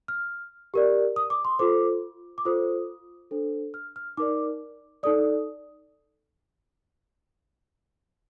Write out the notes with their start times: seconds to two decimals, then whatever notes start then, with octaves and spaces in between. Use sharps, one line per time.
0.08 F6
0.74 G4 A#4 D5
1.16 D#6
1.30 D6
1.45 C6
1.59 F4 A4 C5 D6
2.38 D6
2.45 F4 A4 C5 D#6
3.31 D4 A4 C5
3.74 F6
3.96 F6
4.17 D#4 A#4 D5 D6
5.03 D#4 A4 D5 D#6